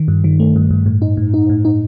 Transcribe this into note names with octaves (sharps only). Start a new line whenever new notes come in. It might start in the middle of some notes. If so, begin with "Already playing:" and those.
Already playing: D#3
G2
D#3
A3
G2
G2
A2
D#4
A2
D#4
A2
D#4